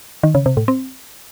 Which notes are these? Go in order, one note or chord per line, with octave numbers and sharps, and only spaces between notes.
D#3
C#3
C3
A2
C4